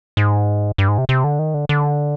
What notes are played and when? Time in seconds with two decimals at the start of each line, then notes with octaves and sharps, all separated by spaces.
0.17 G#2
0.78 G2
0.88 G#2
0.98 C3
1.09 C3
1.24 D3
1.39 D#3
1.54 D3
1.69 D3